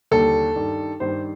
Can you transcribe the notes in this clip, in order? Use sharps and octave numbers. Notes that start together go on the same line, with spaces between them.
D#2 D3 G3 A4
G2 D#3 G3
G2 D#3 G3 C5